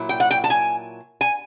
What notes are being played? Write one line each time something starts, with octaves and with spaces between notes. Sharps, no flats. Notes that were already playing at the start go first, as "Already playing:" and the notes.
Already playing: A#2 F#3 E4
G5
F#5
G5
A5
G#5
G#5